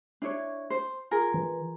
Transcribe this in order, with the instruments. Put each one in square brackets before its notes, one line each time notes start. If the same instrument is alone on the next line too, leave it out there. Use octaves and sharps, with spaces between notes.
[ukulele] D4 E4 C#5
C5
F4 G#4 A#4
[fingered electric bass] E3